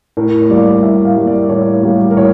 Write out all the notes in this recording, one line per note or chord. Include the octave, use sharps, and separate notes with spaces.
A2 A#4
G3 A#3 D5
A2 E5
F5
G3
A#3
D5
A2 C#5
G3 A#3
A#4
A2 C#5